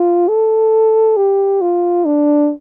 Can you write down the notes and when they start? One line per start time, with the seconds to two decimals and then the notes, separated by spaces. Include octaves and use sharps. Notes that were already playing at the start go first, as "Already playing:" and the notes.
Already playing: F4
0.28 A4
1.17 G4
1.61 F4
2.05 D4